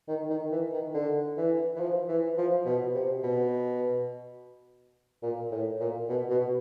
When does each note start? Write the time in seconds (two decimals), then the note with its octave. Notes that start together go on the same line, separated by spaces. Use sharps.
0.08 D#3
0.30 D#3
0.51 E3
0.73 D#3
0.94 D3
1.37 E3
1.76 E3
1.80 F3
2.08 E3
2.38 F3
2.66 B2
2.94 C3
3.23 B2
5.23 A#2
5.52 A2
5.80 A#2
6.09 B2
6.30 B2